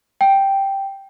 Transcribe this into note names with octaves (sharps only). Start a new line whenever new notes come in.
G5